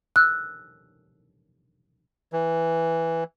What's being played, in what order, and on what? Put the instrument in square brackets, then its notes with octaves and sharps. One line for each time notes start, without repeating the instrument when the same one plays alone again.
[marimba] E6 F#6
[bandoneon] E3